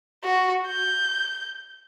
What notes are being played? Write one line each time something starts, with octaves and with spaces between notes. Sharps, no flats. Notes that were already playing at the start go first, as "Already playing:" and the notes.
F#4
G6